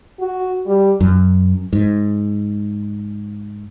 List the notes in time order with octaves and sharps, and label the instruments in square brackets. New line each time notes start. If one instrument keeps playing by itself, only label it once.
[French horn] F#4
G3
[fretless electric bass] F#2
G#2